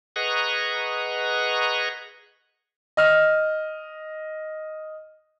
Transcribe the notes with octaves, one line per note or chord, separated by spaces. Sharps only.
G#4 B4 D#5 F#5 A#5 C#6
D#5 F6